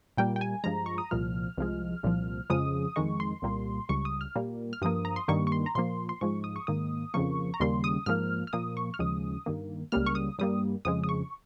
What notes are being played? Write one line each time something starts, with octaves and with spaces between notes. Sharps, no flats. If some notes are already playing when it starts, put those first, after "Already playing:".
A#2 G3 A#3 G5
G5
G#5
G2 F3 G#3 A#5
C#6
D#6
C2 A#2 F3 F6
C2 C3 F3 G#3
C2 A#2 F3
F2 C#3 F3 G#3 D#6
F2 D#3 G#3 C#6
C6
C2 A#2 G3 A#3
C#2 C#3 G3 C#6
D#6
F6
A#2 G3 A#3
F6
G2 F3 A#3 D#6
A#5
C6
G2 D#3 G3 A#3 C#6
C#6
C6
A#5
A#2 F3 A#3 C6
C6
G#2 F3 G#3 C#6
D#6
C#6
G#2 D#3 A#3 D#6
F2 C#3 F3 A#3 C#6
A#5
D#2 C#3 G3 A#3 C6
D#6
G#2 F3 A#3 F6
F6
A#2 F3 A#3 D#6
C#6
F6
D#2 C#3 F3 G#3 D#6
G2 D#3 A#3
C#2 C#3 G3 A#3 F6
C#6
D#6
G2 G3 A#3 D#6
F2 C#3 F3 G#3 D#6
D#6
C#6